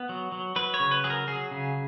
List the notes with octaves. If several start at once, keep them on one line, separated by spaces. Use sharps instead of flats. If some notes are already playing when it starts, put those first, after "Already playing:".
Already playing: B3
F#3
F#3
F#3 B4
C#5
C#3
B4
F#3 G#4
A#4
F#3 G#4
C#3